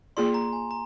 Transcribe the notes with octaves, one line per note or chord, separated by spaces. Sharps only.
A#3 F4 G#4 D5 C6
C6
A#5
G#5
A#5